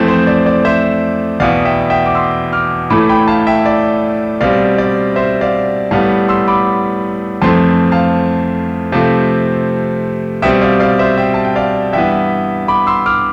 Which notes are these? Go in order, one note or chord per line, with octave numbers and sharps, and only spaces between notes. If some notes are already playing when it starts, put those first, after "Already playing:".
Already playing: F2 E3 A3 C4
C5
D5
D5
C5 E5
E2 B2 B3 D5 F5
E5 G5
E5 G5
D6
C6 E6
D6 F6
A2 E3 A3 B5 D6
G5 B5
F5 A5
E5 G5
D5
B2 G3 C4 D5 F5
D5
C5 E5
D5 F5
A2 G3 B3 F5 A5
C6 E6
B5 D6
F2 E3 A3 C4 A5 C6
F5 A5
C3 F3 A3 C4 F5 A5
B2 G3 C4 E5 G5
D5 F5
D5 F5
C5 E5
E5 G5
A5
G5
D5 F5
G2 E3 B3 E5 G5
B5 D6
C6 E6
D6 F6